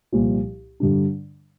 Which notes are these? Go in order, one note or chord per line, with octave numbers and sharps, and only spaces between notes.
C2 A#2 F3
G2 D3 G3 D4